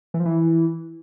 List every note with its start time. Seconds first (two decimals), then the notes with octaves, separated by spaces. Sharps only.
0.14 E3
0.20 F3
0.25 E3